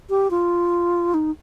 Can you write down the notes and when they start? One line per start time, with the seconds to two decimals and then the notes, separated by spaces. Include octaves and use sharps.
0.09 G4
0.30 F4
1.14 D#4